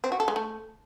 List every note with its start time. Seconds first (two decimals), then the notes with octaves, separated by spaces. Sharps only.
0.04 C4
0.12 F#4
0.20 A4
0.28 G#3
0.36 A3